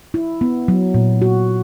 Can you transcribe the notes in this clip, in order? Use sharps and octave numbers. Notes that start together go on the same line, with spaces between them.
E4
B3
F#3
A#2
F#4